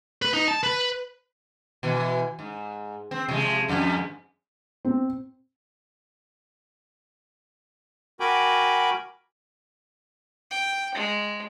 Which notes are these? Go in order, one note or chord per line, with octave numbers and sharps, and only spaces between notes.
B4
D#4
A5
B4
B2 E3
G#2
C4
C3 F3 G#3
F2 G#2
C4
F#4 A#4 G5 G#5 B5 D6
G5
G#3